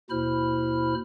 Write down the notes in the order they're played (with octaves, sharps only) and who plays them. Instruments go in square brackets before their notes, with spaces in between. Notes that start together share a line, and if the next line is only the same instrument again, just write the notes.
[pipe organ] D#2 B2 E4 C5 B5 F6